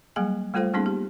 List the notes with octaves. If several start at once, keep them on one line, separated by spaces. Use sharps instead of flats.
F#3 G3 A#3 G#4 G#5
G3 A3 F4 A4 C5 F5
G3 A#3 B3 C#4 D#4 G#4
G4